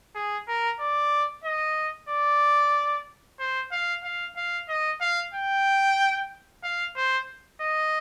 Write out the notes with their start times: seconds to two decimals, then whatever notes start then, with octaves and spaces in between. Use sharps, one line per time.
0.15 G#4
0.48 A#4
0.79 D5
1.44 D#5
2.09 D5
3.39 C5
3.72 F5
4.04 F5
4.37 F5
4.69 D#5
5.01 F5
5.34 G5
6.63 F5
6.96 C5
7.60 D#5